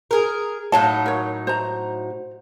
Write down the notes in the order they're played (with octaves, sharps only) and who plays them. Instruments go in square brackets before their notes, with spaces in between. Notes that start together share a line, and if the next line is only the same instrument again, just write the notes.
[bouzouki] G#4 A#4
[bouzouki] A2 F#3 D#4 [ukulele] F5 A5
[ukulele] A#4 C#5
C5 A#5